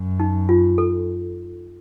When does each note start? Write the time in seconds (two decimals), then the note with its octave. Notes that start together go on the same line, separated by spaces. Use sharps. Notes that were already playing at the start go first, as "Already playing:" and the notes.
Already playing: F#2
0.20 D#4
0.49 F4
0.78 A4